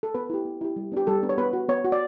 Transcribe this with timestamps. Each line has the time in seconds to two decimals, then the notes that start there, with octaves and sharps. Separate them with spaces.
0.03 A4
0.15 B3 B4
0.30 E4 G4
0.45 B3
0.61 E4 G4
0.76 G3
0.92 B3 D4 G4
1.07 G3 A4
1.23 B3 D4
1.29 C#5
1.38 B3 B4
1.53 F#4
1.69 B3 C#5
1.84 F#4
1.92 D5